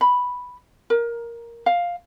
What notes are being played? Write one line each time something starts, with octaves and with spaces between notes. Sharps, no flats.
B5
A#4
F5